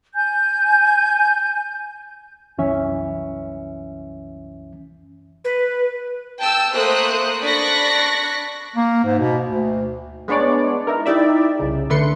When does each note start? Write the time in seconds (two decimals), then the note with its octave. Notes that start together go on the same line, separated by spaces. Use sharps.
0.14 G#5 G6
2.58 C2 F#2 E3 C#4 E5
5.45 B4
6.39 G5 A5 E6
6.72 A3 A#3 C5 D#6 F#6
7.42 D4 D5 B5 C#6 F#6 A#6
8.76 A#3
9.04 G#2
9.19 B2
9.45 D2
10.28 G#3 B3 D4 C#5 D5
10.87 D#4 E4 A#4
11.06 D#4 E4 G4 D5 E5
11.59 C2 C#3
11.90 D3 A3 B4 C6 C#7